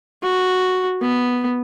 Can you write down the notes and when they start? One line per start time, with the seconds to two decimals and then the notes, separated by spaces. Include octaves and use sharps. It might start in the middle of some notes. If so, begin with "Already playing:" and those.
0.22 F#4
1.02 B3